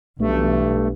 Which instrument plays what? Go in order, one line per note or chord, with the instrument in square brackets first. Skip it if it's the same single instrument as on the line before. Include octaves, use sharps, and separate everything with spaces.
[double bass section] B1 E3 [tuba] G2 [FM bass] A3